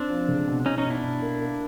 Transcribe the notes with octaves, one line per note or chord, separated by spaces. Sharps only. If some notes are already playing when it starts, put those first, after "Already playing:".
Already playing: C4 D4
F3
C#2
B2
B2 C#4 D#4
C#4 D#4
B2
D4 E4
B2
A#3
A#3